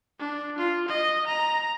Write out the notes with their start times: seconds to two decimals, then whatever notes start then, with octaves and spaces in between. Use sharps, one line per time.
0.20 D4
0.58 F4
0.89 D#5
1.27 A#5